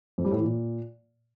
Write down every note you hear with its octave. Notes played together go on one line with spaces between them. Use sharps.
F2
G3
A2
E3
A#2